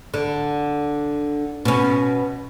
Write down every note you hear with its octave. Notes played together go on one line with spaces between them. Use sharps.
D3
B2 C#4